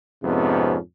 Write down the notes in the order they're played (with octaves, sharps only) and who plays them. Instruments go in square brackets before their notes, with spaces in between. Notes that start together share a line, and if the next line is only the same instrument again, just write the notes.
[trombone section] F2 G#2 C3 B3 C#4